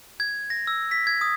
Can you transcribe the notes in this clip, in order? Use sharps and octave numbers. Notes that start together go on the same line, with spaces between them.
G#6
A#6
E6
B6
G#6
D#6